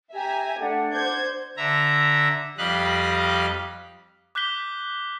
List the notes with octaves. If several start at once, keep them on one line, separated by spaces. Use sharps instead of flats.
G4 E5 G#5 A#5
A3 D4 F#5
C5 G6 G#6
D3 E5 A#5
F2 G3 D#5 F5 B5 F#6
D6 F#6 G6 B6 G7